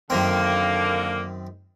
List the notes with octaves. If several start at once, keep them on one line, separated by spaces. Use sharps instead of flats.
F#2 D3 D#3 A#3 C4